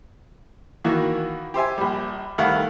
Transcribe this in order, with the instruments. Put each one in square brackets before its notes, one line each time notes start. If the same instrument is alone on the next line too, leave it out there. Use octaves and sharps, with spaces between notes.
[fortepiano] D#3 E3 A#3 F#4
G4 C5 E5 G#5
A#1 G3
C2 D#3 A3 F5 F#5